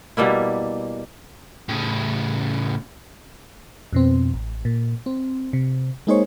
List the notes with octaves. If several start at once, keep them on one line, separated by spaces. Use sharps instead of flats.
B2 G3 A#3 E4
A2 C#3
F2 B2 C4
A1
A#2
C4
C3
G#3 A#3 D#4 G#4 C5 C#5